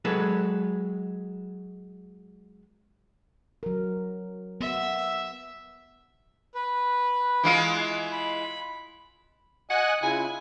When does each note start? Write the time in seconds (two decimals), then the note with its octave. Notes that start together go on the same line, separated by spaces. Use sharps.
0.05 F#3 G#3 A4 B4
3.63 F#3 A#4
4.61 B3 E5
6.55 B4
7.43 E3 G#3 F4
8.12 B5
9.70 D#5 F#5 G#5 F#6
10.02 C#3 E4 F4 G#5